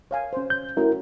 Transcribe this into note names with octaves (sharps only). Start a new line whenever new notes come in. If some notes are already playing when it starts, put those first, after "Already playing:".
C#5 F5 G#5
C#4 C5
G6
A3 C#4 E4 F#4 A#4